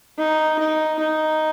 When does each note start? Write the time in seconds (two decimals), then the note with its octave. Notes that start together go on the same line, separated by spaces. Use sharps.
0.18 D#4
0.59 D#4
0.99 D#4